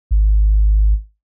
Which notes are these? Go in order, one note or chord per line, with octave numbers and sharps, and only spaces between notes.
G#1